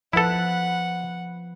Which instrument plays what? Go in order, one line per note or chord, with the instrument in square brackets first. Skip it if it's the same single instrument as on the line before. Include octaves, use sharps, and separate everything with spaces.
[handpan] F3 B4 [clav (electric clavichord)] E4 A4 [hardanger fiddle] F#5